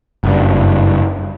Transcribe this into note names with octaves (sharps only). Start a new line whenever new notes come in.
F#1 G2